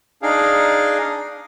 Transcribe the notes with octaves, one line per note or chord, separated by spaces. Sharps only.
D4 D#4 G#4 F5